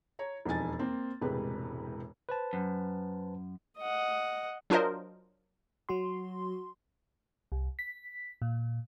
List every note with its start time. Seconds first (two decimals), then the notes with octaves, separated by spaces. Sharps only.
0.19 C#5 A#5
0.45 E1 F2 D#4 G#5 A6
0.79 A#3 C4
1.21 E1 A2 C3 G#3 G4 B4
2.29 B4 C5 A5
2.53 F#2
3.78 D#5 F#5
4.70 F#3 D4 F4 A#4 C5 D#5
5.89 F#3 F#4 C6
7.52 C2
7.79 B6
8.42 A#2